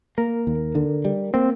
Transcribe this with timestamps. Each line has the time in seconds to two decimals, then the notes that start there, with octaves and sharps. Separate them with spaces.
0.18 A#3 A#4
0.47 D#2
0.75 D3
1.05 G3
1.34 A#3 C4